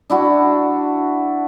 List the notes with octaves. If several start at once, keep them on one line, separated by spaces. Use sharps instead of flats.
D4 E4 F#4